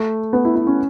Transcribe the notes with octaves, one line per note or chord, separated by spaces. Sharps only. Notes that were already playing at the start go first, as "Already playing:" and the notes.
Already playing: A3
B3
E4
E4
C#4